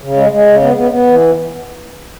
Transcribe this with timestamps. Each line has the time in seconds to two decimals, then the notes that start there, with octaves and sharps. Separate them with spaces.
0.02 C#3
0.16 G#3
0.31 G#3
0.47 C#3
0.61 B3
0.77 B3
0.91 B3
1.07 E3